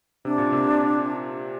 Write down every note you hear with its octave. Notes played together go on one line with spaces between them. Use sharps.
C3 D4
A#2
C3